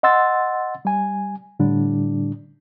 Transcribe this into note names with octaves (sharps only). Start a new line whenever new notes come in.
D#5 F#5 C6 E6 A6
G3 G#5
A2 D3 G3 D4